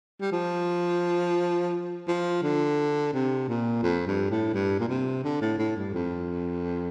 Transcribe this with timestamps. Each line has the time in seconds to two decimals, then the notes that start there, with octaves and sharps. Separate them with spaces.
0.21 G3
0.32 F3
2.07 F3
2.42 D3
3.13 C3
3.48 A#2
3.83 F2
4.07 G2
4.30 A2
4.53 G2
4.79 A#2
4.88 C3
5.24 D3
5.41 A2
5.58 A2
5.77 G2
5.94 F2